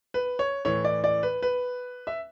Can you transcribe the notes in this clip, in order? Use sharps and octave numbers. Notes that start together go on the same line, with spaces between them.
B4
C#5
A2 E3 C#5
D5
D5
B4
B4
E5